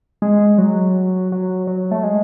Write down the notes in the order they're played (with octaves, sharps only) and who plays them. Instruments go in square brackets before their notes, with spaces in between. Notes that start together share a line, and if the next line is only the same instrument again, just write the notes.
[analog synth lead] G#3
F#3
F#3
F#3
A3
G#3